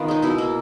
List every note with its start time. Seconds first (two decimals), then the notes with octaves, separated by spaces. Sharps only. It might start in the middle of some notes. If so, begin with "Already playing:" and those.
Already playing: D#3 B3 F4
0.08 G#3 D#4
0.22 B2 E4
0.38 A#3